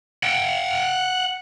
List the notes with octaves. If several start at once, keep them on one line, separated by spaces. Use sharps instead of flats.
F#5 G5